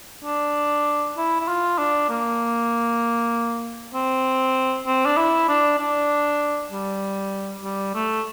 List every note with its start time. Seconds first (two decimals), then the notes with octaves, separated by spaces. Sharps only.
0.24 D4
1.17 E4
1.40 E4
1.48 F4
1.78 D4
2.10 A#3
3.94 C4
4.87 C4
5.06 D4
5.17 E4
5.48 D4
5.79 D4
6.71 G3
7.63 G3
7.95 A3